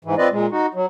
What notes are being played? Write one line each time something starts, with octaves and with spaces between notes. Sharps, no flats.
G#2 E3
C4 F4 B4 D5 D#5
A#2 G#3
D#4 F#4
F#3